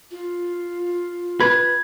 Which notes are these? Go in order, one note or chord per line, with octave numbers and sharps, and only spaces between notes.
F4
B4 G#6